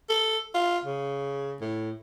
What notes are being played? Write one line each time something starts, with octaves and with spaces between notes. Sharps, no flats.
A4
F4
C#3
A2